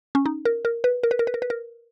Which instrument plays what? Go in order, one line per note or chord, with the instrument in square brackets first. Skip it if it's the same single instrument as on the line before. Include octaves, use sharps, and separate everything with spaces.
[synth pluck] C#4
D#4
A#4
A#4
B4
A#4
B4
A#4
B4
A#4
B4
A#4